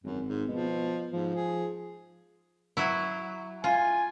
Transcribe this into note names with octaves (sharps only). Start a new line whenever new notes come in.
G#1 F#2
G#2
B2 F3
G#2 F3
G#4
F#3 E4
F4 G#5